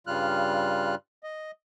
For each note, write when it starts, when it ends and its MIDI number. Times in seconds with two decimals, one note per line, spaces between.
0.07 0.95 43
0.07 0.95 49
0.07 0.95 55
0.07 0.95 65
0.07 0.95 89
0.07 0.95 90
1.23 1.51 75